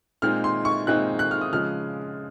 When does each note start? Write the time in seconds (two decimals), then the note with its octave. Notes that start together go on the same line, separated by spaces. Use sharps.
0.22 A#2 G#3 C4 D#4 F6
0.44 C6
0.65 C#6
0.87 A#2 G#3 C4 D#4 F#6
1.19 F#6
1.31 F6
1.41 D#6
1.53 C#3 F3 G#3 F6